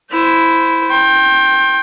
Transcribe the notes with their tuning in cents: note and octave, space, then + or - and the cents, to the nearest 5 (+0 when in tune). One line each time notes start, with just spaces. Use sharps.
E4 +0 C5 -10
G5 +0 C6 +35